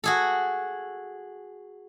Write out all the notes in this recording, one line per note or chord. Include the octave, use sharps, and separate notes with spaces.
F#4 G#4 A4